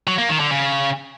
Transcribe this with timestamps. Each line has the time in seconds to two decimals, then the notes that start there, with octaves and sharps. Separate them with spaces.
0.07 F#3
0.18 A#3
0.29 D#3
0.40 D3
0.51 C#3